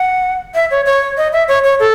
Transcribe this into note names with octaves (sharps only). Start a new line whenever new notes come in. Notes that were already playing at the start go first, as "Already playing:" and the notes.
Already playing: F#5
E5
C#5
C#5
D#5
E5
C#5
C#5
A4